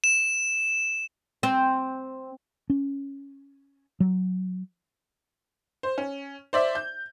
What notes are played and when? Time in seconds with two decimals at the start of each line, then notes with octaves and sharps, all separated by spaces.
0.04 E7
1.43 C4
2.70 C#4
4.00 F#3
5.83 C5
5.98 C#4
6.53 C5 D5 E5
6.75 G6